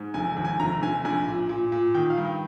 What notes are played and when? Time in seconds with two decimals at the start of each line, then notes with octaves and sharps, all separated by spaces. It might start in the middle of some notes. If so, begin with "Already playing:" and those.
Already playing: G#2
0.14 F1 G#5
0.29 G#5
0.37 D#2
0.45 G#5
0.59 F1 A#5
0.82 F1 G#5
1.05 A#1 G#5
1.27 A#2
1.49 A#2
1.72 A#2
1.94 D#3 G5
2.10 F5
2.17 G2
2.25 G5